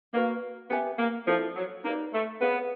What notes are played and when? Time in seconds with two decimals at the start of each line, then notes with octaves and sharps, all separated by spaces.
0.14 A#3 F#4 B4 D5 F5
0.70 B3 G4 B4 E5 G#5
0.99 A#3
1.27 F3 E4 A4 D5
1.56 F#3
1.84 A#3 D#4 G4 B4 D5
2.14 A3
2.42 B3 G#4 C#5 F5